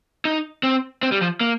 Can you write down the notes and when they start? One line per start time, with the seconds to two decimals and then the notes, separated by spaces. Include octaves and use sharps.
0.25 D#4
0.63 C4
1.03 C4
1.12 G3
1.22 F3
1.41 A#3